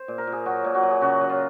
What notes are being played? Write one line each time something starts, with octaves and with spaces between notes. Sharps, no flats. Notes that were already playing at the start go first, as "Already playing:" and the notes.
Already playing: C5
A#2
A#4
A#2 G#4
F#3 F#4
A#2
F#4
F#3
G#4
C#3 F#4
F#3
F4